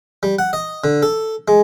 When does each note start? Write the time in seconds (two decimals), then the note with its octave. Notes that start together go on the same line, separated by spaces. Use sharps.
0.23 G3
0.39 F#5
0.53 D#5
0.84 D3
1.03 A4
1.48 G#3